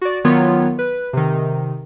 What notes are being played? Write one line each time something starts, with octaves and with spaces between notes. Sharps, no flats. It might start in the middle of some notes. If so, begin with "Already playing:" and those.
F#4 D5
D#3 F#3 B3 F4 C#5
B4
C3 D#3